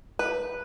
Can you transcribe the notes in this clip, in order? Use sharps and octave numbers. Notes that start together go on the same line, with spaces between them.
B4